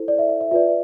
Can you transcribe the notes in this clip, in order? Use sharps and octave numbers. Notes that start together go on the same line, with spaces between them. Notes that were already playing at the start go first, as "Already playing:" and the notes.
Already playing: E4 A4 C5
D5
E5
E5
E5
F4 B4 D5 E5